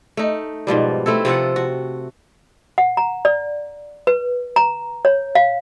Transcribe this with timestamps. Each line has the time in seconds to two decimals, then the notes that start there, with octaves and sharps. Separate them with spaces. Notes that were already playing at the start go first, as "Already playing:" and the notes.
0.17 A3 D#4
0.67 G#2 B2 F3 G3
1.06 A3 C4 E4 A4
1.25 C3 F3 A4 F#5
1.56 F#4
2.78 F#5
2.97 A#5
3.25 D5
4.07 B4
4.56 A#5
5.05 C#5
5.35 F5